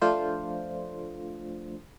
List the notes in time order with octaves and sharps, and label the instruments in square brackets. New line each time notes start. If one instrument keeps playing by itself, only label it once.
[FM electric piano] F3 A3 D4 F4 C5